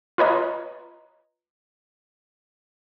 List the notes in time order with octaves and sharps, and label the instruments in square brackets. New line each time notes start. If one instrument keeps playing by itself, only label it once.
[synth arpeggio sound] F4 B4 C#5 D#5 A#5